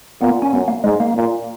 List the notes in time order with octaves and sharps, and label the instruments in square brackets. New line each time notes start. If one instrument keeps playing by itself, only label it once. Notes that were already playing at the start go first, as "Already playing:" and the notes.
[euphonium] A#2 [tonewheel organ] B3
[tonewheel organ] C#4
[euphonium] F#2 [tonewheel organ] B3
[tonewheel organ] A#3
[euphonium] G#2 [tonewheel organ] G#3
[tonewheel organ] A#3
[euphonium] A#2